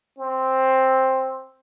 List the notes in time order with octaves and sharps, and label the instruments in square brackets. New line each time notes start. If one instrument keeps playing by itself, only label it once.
[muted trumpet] C4